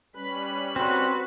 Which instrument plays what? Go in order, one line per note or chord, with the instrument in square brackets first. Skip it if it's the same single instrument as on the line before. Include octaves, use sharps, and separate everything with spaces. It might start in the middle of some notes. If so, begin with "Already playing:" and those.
[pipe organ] G3 C#4 B5 [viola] B4
[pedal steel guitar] C4 [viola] F#4 B4